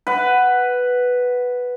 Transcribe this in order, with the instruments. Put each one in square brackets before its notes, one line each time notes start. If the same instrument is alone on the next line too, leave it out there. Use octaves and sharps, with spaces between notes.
[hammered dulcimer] B4 F#5